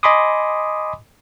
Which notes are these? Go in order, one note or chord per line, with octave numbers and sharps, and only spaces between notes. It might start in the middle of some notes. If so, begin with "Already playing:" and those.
D#5 G#5 B5 C6 D6 D#6